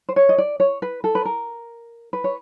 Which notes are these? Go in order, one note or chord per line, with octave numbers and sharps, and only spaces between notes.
C5
C#5
D#5
D5
C#5
B4
A4
B4
A#4
B4
C#5